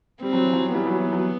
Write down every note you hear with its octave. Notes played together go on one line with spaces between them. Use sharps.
G3 C4
F#3
E3
F#3
E3 G3 B3
F#3
E3
F#3